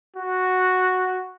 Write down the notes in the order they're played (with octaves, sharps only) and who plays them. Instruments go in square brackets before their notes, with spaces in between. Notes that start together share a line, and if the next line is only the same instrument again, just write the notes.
[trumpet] F#4